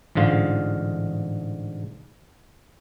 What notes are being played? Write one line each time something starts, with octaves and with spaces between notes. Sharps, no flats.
A1 G#2 D3 F4 F5